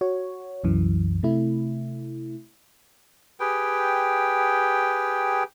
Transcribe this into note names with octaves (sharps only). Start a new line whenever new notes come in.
F#4 C#5
C2 F#2 E3
C3 A3 E4
G4 G#4 B4 G5